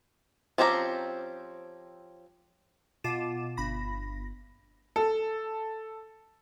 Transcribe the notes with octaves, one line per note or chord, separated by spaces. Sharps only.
F3 C4 C#4 G4 A#5
B2 F4 D6 E7
G1 B5 A#6
A4